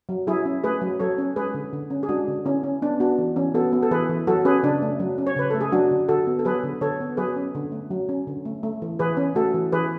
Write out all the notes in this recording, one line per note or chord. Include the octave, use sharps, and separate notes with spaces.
F#3
F#3 E4 G#4
C#4
A3 G#4 B4
F#3
F#3 A4 C#5
C#4
G#3 G#4 B4
D3
D3
C#4
G#4
G#3 D4 F#4
D3
D3 C#4 E4
C#4
B3 D4
B3 D4 F#4
E3
E3 C#4
B3 F#4 A4
B3
A4
E3 G#4 B4
E3
F#3 F#4 A4
C#4 G#4 B4
C#3 D4
A3
F#3
C#4
C#5
C#3 B4
A3 A4
G#4
F#3 D4 F#4
D3
D3 F#4 A4
B3
A4
F#3 G#4 B4
D3
D3 A4 C#5
B3
F#3 G#4 B4
C#4
D3
A3
F#3
C#4
D3
A3
A3
E3
E3 G#4 B4
C#4
A3 F#4 A4
E3
E3 G#4 B4